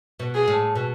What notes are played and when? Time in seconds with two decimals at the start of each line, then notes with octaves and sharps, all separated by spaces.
0.19 B2
0.34 G#4
0.48 A2
0.75 B2